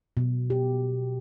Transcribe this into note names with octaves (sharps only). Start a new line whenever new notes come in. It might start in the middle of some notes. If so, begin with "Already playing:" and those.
B2
G4